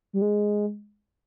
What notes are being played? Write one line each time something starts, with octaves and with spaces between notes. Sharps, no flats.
G3
G#3